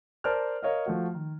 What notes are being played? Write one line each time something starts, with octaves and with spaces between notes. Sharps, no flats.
A#4 C5 D5 A5 F6
A#4 C#5 D#5 F5
F3 A3 F#4
D#3